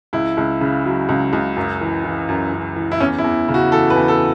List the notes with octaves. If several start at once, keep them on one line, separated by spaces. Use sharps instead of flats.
C#2 E4
C#2
C#3
F#3
C#2
C#2
F#2
E3
E3
F#2
F#2
E3
E4
E2 C#4
E4
E2
C#3
F#4
E3 A4
B4
E2
A4